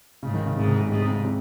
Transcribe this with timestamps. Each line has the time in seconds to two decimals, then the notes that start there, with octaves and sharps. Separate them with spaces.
0.23 G#2 C#3
0.34 D#3
0.46 C#3
0.57 G#2 C3
0.68 C#3
0.80 C3
0.90 G#2 C3
1.02 C3
1.08 C#3
1.13 C3
1.25 C3